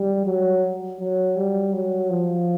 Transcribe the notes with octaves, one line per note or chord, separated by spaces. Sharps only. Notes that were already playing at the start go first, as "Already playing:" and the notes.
Already playing: G3
F#3
F#3
G3
F#3
F3